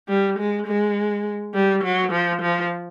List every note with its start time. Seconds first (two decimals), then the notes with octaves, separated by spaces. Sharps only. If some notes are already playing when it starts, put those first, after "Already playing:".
0.09 G3
0.39 G#3
0.67 G#3
1.54 G3
1.84 F#3
2.12 F3
2.42 F3